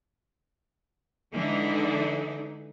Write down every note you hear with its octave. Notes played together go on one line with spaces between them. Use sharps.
D3 E3 G#3 D#4